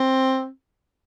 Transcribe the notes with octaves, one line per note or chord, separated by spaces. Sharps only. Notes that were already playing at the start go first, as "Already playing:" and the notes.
Already playing: C4